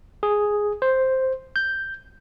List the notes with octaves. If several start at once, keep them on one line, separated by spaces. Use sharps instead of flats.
G#4
C5
G6